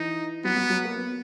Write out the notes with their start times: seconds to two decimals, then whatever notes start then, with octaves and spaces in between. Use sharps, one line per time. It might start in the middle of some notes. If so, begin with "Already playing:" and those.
Already playing: E3 D#4
0.44 F#3 B3
0.57 F#3
0.70 F#3
0.84 A#3
0.97 B3